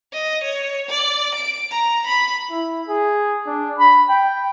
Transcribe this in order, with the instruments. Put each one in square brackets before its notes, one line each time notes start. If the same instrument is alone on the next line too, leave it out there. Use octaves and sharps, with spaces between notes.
[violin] D#5
C#5
D5
D7
A#5
B5
[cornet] E4
G#4
D4
B5
G5